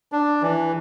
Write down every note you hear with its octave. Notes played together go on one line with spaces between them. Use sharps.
D4
E3